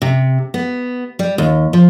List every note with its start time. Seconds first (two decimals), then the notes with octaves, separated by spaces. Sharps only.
0.02 C3
0.54 B3
1.19 G3
1.38 D#2
1.73 F3